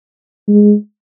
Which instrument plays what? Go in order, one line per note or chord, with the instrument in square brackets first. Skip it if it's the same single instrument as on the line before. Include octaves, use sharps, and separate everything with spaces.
[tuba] G#3